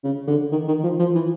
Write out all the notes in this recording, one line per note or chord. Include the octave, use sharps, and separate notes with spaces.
C#3
D3
D#3
D#3
F3
F3
E3